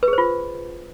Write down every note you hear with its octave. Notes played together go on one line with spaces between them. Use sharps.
B4
G#4
C5
F4